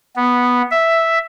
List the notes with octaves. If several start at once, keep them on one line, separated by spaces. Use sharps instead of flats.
B3
E5